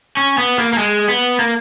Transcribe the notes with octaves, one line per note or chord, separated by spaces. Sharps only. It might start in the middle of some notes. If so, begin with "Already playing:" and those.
C#4
B3
A#3
A#3
G#3
B3
A#3